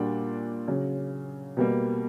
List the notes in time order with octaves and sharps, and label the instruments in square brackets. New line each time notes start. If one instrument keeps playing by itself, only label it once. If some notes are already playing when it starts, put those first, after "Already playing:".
Already playing: [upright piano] A#2 G3 A#3 D4 F#4
C#3 F#3 C#4
B2 G3 A#3